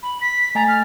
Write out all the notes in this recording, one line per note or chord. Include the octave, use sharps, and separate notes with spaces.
B5
B6
A3 G#5 A#5 A6
F6